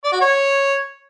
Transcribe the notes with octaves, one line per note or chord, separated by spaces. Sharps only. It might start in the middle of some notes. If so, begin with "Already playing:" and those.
D5
F#4
C#5